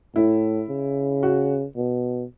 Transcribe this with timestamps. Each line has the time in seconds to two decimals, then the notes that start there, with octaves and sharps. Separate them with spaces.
0.15 A2 E4
0.69 C#3
1.23 F#4
1.76 B2